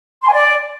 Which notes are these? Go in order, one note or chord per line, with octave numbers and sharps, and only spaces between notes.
C6
G#5
D5